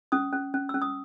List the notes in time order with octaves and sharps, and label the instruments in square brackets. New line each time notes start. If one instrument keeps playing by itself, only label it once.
[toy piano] C#4 D#6
C#4
C#4
E6
C#4
D#6